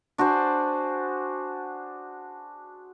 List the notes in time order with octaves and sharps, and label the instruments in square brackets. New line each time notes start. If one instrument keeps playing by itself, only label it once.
[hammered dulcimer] D4 F#4 G#4 C5